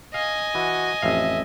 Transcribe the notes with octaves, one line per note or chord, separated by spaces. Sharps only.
D#5 F5 G#5
E3 F#4
A1 F2 E5 F5